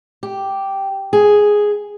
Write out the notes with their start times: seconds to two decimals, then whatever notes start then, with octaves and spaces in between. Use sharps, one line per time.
0.23 G4
1.13 G#4